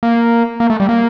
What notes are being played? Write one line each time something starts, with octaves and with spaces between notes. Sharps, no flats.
A#3
A#3
A3
G3
A#3